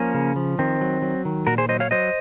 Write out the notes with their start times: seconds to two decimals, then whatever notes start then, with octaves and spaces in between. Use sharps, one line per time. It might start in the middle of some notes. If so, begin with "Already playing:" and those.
Already playing: F3 A#3 C#4
0.14 C#3
0.36 F3
0.59 D#3 C4
0.81 F#3
1.02 F#3
1.25 D#3
1.47 A#2 F#4 A#4
1.58 G#4 C5
1.69 F#3 C5 D#5
1.80 C#5 F5
1.91 F#3 C5 D#5